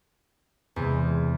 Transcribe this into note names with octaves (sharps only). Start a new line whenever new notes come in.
E2 C3 G#3